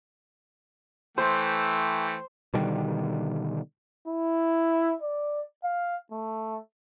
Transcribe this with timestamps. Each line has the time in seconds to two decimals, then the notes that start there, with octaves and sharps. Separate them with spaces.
1.18 E3 A3 C5 G5
2.54 B2 D3 D#3 G3
4.08 E4
5.02 D5
5.64 F5
6.12 A3